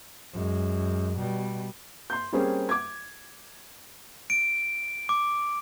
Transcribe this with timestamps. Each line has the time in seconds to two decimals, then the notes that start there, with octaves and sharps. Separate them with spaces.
0.33 F#2 G#3
1.18 B2 G3
2.10 C6 G6
2.33 G3 A#3 C4 C#4 G4 G#4
2.69 D6 G#6
4.30 D7
5.09 D6